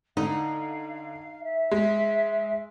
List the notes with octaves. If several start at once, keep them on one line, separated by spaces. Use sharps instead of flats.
D3 D#4 F5
E5
G#3